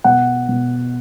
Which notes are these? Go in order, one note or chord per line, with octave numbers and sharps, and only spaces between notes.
B2 F#5
B2